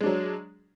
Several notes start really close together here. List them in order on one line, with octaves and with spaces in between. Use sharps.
G#3 D4 F#3